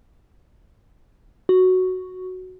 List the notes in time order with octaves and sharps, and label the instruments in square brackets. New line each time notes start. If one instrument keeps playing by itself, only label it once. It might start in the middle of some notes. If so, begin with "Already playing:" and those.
[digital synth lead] F#4